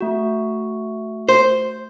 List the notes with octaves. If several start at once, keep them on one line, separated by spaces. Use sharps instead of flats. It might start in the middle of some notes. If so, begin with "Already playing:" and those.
A3 F#4
C5